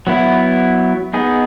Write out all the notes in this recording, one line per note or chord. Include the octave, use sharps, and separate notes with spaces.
F#3 B3 E4
B3 D#4 G#4